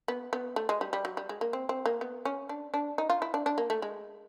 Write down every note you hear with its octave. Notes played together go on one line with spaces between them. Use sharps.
B3
B3
A3
G#3
G3
G3
F#3
G3
G#3
A#3
C4
C4
A#3
B3
C#4
D4
D4
D#4
F4
E4
D4
D4
A#3
A3
G#3